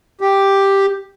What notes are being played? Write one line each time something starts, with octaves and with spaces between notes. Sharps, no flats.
G4